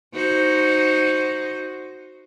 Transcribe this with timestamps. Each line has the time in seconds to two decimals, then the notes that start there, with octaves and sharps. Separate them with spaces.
0.14 D#4 F#4 C5